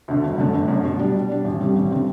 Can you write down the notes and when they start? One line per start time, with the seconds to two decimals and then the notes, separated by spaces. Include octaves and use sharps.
0.08 D2 D3
0.23 G1
0.38 F#2 D3 A3
0.53 G1
0.68 F#2 D3 A3
0.84 B2
0.99 G3 D4
1.14 B2
1.29 G3 D4
1.44 A1
1.60 G2 D3 G3 C4
1.76 A1
1.91 D3 G3 C4